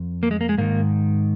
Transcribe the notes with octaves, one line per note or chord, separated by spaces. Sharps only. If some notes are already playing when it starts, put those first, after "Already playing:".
Already playing: F2
A#3
G#3
A#3
G#3
G#2 D#3 A#3